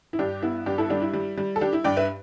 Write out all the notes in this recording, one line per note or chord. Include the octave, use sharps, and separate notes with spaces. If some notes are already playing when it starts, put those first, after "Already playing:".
E4
G2 D4 G4
B3 E4
G2 D4 G4
E4 A4
G3 D4 G4
E4
G3
G3
A4
G3 D4 G4
E4
G2 D5 G5
B4 E5